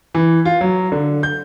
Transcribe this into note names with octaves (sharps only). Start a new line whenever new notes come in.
E3
F4
F#3
D3
G6